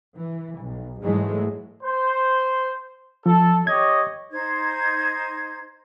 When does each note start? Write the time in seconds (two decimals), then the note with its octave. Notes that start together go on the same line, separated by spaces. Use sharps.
0.16 E3
0.58 B1
1.01 G#2 E3 F#3 G#3 A3
1.83 C5
3.26 F3 A4
3.67 G4 C#5 D#5 G#6
4.31 D#4 C5 G#6